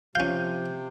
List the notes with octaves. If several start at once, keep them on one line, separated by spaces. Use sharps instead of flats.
C3 F3 C#4 F5 G6